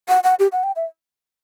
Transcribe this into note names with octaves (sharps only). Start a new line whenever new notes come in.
F#5
F#5
G4
F#5
G5
E5